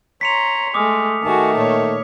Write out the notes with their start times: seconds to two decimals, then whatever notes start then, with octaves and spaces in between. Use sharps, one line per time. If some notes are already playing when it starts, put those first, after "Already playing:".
0.21 C#5 A#5 C6 B6 C#7 F7
0.74 G#3 A3 D6 D#6 F6
1.23 D#3 A3 F#4 G#4 A5
1.56 A#2 C#5